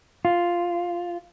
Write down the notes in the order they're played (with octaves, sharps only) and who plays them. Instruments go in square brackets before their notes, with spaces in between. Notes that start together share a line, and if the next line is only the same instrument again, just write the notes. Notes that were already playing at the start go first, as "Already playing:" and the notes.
[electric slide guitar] F4